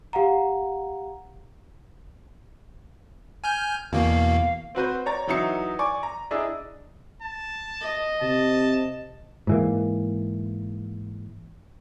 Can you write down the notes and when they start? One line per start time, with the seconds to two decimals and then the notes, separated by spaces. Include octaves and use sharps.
0.13 G4 F5 F#5 A#5
3.44 G#5 F6 G6
3.93 E2 B2 A#3 F5
4.75 C4 F#4 B4 C5
5.06 C#5 D5 A#5 A6
5.27 E3 F#3 D#4 E5 C#7
5.79 D5 G#5 C#6 D6
6.03 A#5
6.31 D4 E4 G#4 D5 D#5
7.22 A5
7.81 D#5
8.22 C3 A5
9.47 G#2 E3 A#3